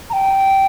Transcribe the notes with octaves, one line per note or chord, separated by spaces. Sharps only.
A#5
G5